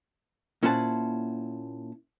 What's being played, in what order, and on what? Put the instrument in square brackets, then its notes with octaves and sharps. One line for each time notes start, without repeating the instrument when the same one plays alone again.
[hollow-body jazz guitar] A#2 C#4 E4 C5 F#5 A5